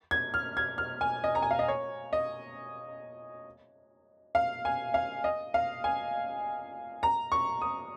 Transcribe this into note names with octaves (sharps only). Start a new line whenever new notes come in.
G#6
F6
G#6
F6
G#5
D#5
A#5
G#5
F5
D#5
C#5
D#5
F5
G#5
F5
D#5
F5
G#5
A#5
C#6
D#6